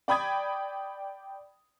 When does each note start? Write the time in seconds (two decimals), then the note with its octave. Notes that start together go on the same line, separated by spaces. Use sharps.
0.08 D5 G5 B5 D#6 G#6